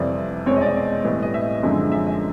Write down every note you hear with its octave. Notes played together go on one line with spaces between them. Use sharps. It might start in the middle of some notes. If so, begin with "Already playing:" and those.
Already playing: F2 C3 E3 G3 D5
E2 B2 G#3 C4 C#5
D#5
D5
D#5
A2 E3 G3
D#5
E5
F#2 D3 F3 G#3 C4
E5
D#5